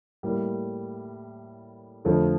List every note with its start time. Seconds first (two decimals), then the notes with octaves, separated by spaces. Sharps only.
0.23 A2 G3 A#3
2.05 F2 D3 F3 A3